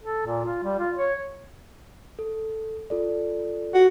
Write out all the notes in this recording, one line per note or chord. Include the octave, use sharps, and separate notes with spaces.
A4
A#2
F4
G3
F4
C#5
A4
F4 A4 D5
F#4